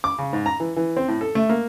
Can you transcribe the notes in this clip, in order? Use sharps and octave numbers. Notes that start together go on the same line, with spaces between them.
D6
C#3
G#2
A#5
E3
E3
C4
A2
A4
A3
A#3